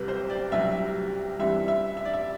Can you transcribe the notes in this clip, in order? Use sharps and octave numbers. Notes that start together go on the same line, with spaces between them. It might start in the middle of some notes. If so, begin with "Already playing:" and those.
Already playing: C2 C3 F#3 B4
C5
D5
C2 C3 F#3 E5
G2 E3 G3 C4 E5
E5
E5
D5
E5